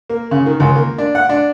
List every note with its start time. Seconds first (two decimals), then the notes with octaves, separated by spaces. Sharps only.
0.10 A#3
0.31 C#3
0.46 D#3
0.60 C#2
0.76 A#3
0.98 D4
1.15 F#5
1.29 D4